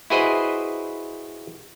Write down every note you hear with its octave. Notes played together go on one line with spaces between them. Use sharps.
E4 F#4 G#4 B4 C5 D#5